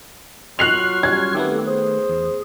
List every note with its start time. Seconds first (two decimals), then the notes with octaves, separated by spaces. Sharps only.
0.59 F#3 F4 C#6 F6 F#6 C7 F7
1.03 G3 C#4 G#6
1.34 D#3 A3 B3 C4 G4 A4
1.67 G#4 C5
2.09 E2